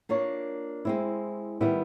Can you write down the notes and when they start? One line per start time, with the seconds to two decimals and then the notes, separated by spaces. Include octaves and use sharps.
0.09 A#3 D4 F4 A#4 C#5
0.85 G#3 C4 E4
1.61 D#3 G3 B3 E4